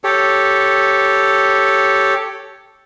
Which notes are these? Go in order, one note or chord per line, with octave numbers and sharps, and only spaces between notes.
G4 A4 C#5